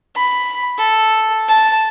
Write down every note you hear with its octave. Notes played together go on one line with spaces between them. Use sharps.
B5
A4
A5